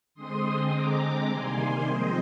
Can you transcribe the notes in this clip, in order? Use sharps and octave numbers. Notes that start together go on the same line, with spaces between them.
D3 G#3 C4 C6 D#6
D3 G#3 C4 A#5 D6
C3 D#3 G3 A#3 G#5 C6
C3 F3 G#3 C4 C5 D#5